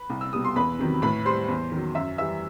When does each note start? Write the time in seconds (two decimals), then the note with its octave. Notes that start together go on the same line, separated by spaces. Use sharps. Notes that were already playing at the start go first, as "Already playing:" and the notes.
Already playing: B4 B5
0.10 C2
0.21 E6
0.33 B2 G3 D#6
0.45 C6
0.56 E2 B4 B5
0.79 C3 D#3 F#3
1.02 A2 B4 B5
1.25 G3 C5 C6
1.48 E2
1.72 D#3
1.77 F#3
1.95 F#2 E5 E6
2.18 E3 G3 E5 E6